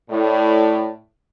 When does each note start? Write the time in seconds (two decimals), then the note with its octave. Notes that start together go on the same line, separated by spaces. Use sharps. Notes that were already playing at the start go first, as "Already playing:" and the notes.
0.11 A2 D5